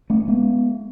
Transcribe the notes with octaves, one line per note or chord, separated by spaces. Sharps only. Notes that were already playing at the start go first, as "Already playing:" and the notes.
A3 C#4
G#3 B3